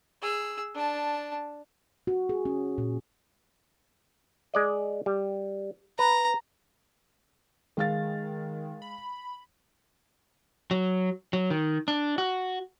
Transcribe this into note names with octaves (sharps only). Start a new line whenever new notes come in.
G#4 E6
D4 A5
F#4
G#4
C#4
A#2
G#3 D5 D#5
G3
B4 A#5
D#3 G#3 F5 A6
B5
F#3
F#3
D#3
D4
F#4